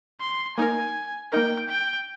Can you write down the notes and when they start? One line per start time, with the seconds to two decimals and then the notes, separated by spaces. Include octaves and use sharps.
0.20 C6
0.57 A#3 D#4 A#4 G#5
1.32 A#3 D#4 A#4 G5
1.69 G5